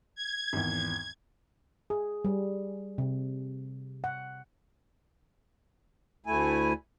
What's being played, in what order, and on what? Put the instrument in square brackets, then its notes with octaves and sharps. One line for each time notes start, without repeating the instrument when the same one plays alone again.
[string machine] G#6
[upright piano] G#1 E2
[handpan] G#4
G3
C3
F#5
[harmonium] D2 A3 E4 G#5